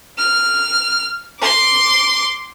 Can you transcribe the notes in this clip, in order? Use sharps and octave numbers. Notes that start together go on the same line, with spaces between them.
F6
C6 D6